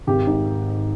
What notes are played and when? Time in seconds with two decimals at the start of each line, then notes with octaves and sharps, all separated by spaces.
0.07 G#1 G4
0.27 G#2